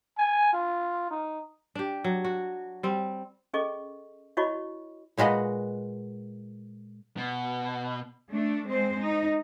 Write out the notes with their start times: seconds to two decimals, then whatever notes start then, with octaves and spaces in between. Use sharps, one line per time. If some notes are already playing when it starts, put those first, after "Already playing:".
0.18 G#5
0.53 F4
1.11 D#4
1.75 D4 G4
2.04 F#3
2.24 F#4
2.83 G3 C4
3.54 C#4 G#4 A4 D#5 C#6
4.37 E4 F#4 C#5 D#5 B5 C#6
5.17 A#2 G#3 F#4 B4 D#5
7.17 B2
8.32 A3 D4
8.68 G#3 C4 C5
9.02 D#4